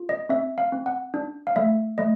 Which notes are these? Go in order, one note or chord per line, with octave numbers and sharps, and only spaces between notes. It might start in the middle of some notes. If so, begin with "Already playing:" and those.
Already playing: F4
D#5
C4 E5
F5
C4
F#5
D4
F5
A3 E5
A3 D#5